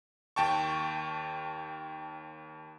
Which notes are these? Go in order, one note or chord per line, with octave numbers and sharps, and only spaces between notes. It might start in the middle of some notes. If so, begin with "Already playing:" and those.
D#2 G5 A5 C#6